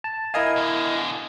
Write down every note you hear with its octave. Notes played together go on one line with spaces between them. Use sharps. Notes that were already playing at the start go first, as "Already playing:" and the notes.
A5
E4 A#4 D#5 F5 G#5
B2 D3